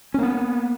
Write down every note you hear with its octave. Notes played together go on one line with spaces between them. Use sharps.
A#3 B3 C#4